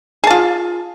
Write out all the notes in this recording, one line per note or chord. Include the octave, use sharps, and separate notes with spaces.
F4 G#4 A5